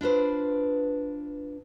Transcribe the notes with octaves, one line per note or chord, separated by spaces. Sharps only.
D4 F4 B4 C5